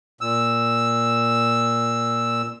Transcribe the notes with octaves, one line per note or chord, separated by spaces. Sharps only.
A#2 E6